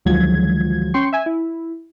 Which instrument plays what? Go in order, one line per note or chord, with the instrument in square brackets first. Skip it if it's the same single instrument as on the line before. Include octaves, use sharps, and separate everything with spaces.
[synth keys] D2 D#3 F3 F#3 G#3 G#6
C#4 G5 C6 C#6
E5 G#5
E4